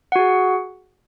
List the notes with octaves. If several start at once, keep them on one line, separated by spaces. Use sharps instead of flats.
F#4 G#4 F#5